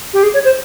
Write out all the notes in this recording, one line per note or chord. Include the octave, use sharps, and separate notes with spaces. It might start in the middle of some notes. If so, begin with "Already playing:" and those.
G4
G#4
C#5
C5